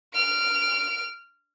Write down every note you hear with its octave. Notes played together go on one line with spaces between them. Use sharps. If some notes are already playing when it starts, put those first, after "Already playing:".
F6 D7